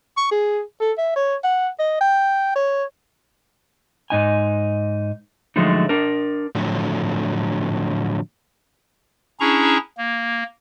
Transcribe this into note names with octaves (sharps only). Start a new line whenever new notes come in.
C#6
G#4
A4
E5
C#5
F#5
D#5
G5
C#5
G#2 D#4 G#5
D3 F3 F#3 G#3 A3 D#4
D4 A#4
A2 D3 F3 F#3
C#4 D4 E4 G#4 A#5 C#6
A#3